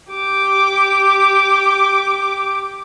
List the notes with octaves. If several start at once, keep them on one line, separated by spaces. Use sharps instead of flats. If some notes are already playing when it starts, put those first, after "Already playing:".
G4 D6